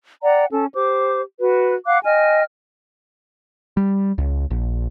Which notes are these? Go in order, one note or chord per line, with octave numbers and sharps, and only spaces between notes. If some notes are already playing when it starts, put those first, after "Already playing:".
D5 F#5 G5 A#5
C#4 A4 A5
G4 C5 D6
F#4 B4
F5 F#5 D6 F#6
D#5 G5 G#5 F6
G3
C#2
A#1